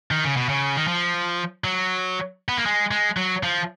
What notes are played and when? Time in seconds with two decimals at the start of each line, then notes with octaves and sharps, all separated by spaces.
0.11 D#3
0.24 C#3
0.37 B2
0.49 C#3
0.76 D#3
0.88 F3
1.64 F#3
2.49 B3
2.57 A#3
2.66 G#3
2.91 G#3
3.17 F#3
3.43 F3